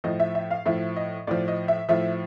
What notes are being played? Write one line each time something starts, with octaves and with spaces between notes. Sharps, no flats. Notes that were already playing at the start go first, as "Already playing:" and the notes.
A2 F3 D#5
E5
E5
F5
A2 F3 E5
D#5
A2 F3 D5
D#5
E5
A2 F3 E5